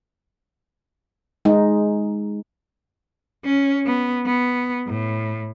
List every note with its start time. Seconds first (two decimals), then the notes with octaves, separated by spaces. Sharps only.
1.45 G#3 D#4
3.45 C#4
3.86 B3
4.26 B3
4.87 A2